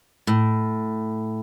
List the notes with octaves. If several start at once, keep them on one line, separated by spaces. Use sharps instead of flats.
A2